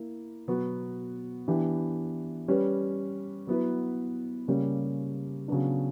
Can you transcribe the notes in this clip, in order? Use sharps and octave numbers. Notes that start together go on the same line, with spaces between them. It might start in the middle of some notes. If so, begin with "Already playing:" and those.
Already playing: A#3 E4
B2 F#3 B3 F#4
E3 B3 D4 G4
G3 C#4 G4 B4
F#3 B3 E4 B4
C#3 G3 A#3 C#4 G4
C#3 F#3 B3 D4